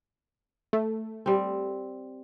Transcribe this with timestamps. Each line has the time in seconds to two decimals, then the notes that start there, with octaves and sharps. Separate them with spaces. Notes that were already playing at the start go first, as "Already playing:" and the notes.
0.73 A3
1.26 G3 C4